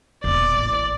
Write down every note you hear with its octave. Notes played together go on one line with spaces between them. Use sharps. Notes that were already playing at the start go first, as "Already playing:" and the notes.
E1 A#2 D5
A1